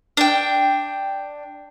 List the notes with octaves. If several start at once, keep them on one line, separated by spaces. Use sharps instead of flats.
D4 G5